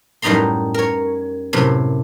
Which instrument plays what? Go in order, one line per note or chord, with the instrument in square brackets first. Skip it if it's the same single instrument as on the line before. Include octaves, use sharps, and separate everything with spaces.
[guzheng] F#2 A2 G3 D#4 A#5 C6
A#4 C#5
F#2 A2 C3